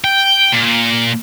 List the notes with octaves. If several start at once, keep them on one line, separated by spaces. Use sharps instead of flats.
G5
A#2